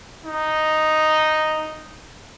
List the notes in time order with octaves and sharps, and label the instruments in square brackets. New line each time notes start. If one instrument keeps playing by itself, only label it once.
[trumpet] D#4